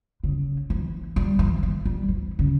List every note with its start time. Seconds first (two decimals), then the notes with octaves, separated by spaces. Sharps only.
0.24 C#3
0.70 E3
1.16 G3
1.39 E3
1.63 E3
1.86 G3
2.09 E3
2.39 C#3